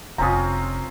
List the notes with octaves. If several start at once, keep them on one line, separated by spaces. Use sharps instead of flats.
F1 C4 C#4 E4 F4 A#5 D#6